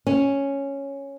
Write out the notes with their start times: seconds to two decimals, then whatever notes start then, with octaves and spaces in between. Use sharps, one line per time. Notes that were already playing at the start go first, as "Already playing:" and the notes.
0.07 C#4